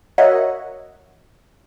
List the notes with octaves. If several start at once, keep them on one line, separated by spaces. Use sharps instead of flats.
F#4 A#4 C#5 D#5 E5 F#5